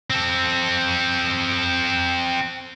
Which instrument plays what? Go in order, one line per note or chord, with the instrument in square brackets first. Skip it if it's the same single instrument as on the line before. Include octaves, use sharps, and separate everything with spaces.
[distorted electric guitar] C4 A4